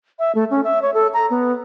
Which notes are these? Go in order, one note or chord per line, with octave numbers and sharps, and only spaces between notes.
E5
A3
C#4
E5
C#5
A4
A#5
B3